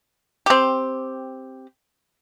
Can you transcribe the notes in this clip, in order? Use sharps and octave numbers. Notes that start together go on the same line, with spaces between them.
C4 G4